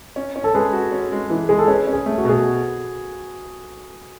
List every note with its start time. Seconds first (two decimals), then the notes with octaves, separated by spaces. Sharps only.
0.16 C#4
0.36 C#4
0.44 A4
0.54 G#3 G#4 B4
0.73 F#4
0.92 C#4
1.12 G#3
1.30 E3
1.49 G#3 G#4
1.59 A4
1.68 C#4 G#4 B4
1.87 C#4
1.93 G#4
2.06 A3
2.18 F#4
2.25 B2 G#4